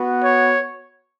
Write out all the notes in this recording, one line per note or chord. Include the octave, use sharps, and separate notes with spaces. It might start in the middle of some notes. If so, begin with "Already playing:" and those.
Already playing: B3 F#4
C#5